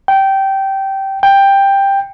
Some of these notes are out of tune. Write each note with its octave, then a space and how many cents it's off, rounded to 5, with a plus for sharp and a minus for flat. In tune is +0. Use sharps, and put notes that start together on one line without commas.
G5 -15
G5 +10